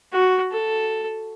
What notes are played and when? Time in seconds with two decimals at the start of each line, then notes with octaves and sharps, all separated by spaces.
0.13 F#4
0.52 A4